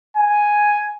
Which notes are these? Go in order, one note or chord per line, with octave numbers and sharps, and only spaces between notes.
G#5